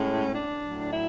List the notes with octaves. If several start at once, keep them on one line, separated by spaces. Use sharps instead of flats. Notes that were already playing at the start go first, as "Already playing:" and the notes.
Already playing: A2 G#3 C#4
D4
A2 F#3
E4